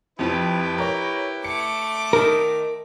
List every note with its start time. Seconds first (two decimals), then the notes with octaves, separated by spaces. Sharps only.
0.19 F2 F3 E4 G4 B4
0.78 A#4 C#5 A#5
1.44 A3 D6 C#7
2.13 D#3 D#4 A#4